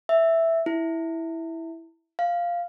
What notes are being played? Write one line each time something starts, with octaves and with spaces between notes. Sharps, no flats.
E5
E4
F5